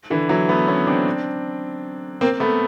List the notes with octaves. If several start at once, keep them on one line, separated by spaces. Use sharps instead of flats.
D3 E3
E3 F#3
A3 B3
B3 C#4
C4 D4
A#3 C4
A3 B3